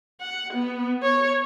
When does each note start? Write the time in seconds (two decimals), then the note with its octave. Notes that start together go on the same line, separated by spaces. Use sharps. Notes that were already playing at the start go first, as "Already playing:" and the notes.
0.21 F#5
0.53 B3
1.03 C#5